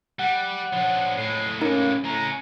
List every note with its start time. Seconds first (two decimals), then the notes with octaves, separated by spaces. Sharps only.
0.19 G3 F#5
0.73 F3 D4 C#5
1.18 A2 G#3 C7
1.61 A#3 C#4 D#4
2.05 A2 G#3 C#4 A#5